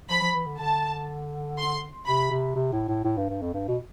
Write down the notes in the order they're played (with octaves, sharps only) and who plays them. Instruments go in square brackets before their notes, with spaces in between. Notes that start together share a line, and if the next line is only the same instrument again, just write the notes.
[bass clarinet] F3 [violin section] B5
[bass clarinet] F3
E3
D3
[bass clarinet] D3 [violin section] A5
[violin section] C6
[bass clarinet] C3 [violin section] B5
[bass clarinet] C3
C3
A2
A2
A2
G2
G2
F2
G2
B2